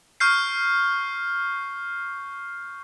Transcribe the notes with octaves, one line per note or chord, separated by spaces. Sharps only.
C#6 F6 G6 C7